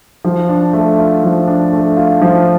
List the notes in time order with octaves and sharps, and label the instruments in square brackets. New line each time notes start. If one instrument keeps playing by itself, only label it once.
[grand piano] F3
D4
A3
F4
F3
D4
A3
F4
F3